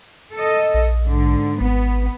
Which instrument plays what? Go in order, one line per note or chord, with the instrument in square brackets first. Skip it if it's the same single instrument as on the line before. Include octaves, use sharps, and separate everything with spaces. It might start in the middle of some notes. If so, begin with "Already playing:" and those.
[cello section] A4 D#5
[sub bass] A#1
[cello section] G#2 D3
[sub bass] G#1 [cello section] B3